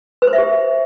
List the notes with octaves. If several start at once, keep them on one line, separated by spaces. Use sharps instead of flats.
B4
C5
E5
G4